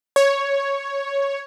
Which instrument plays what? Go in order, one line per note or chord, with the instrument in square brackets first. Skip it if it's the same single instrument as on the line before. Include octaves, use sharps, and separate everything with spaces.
[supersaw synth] C#5